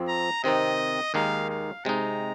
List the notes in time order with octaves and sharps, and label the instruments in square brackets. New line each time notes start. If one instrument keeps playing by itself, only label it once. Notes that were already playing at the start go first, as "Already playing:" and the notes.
Already playing: [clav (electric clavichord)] F2 F3 C4
[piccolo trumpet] A#5
[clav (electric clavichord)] C3 D#3 C4 D#4 [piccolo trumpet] D#5
[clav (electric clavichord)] D#2 D#3 G#3 D#4 [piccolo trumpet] F5
[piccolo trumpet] F5
[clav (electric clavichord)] C3 G#3 D#4 [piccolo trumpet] A#5